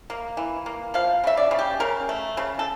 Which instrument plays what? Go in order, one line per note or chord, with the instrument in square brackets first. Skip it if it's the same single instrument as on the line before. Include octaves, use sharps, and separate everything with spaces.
[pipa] A#3
E3
A#3
F3 F5
C#3 E5
D5
C#3
G4
C#3 A#4
A3
C#3
A4